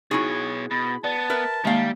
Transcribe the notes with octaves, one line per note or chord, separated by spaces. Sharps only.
B2 D#4 E4 F#4 G#4 C#5
B2 B5
B3 D5 A5
A#4 B4 E5
D#3 G3 G#3 A#3 F5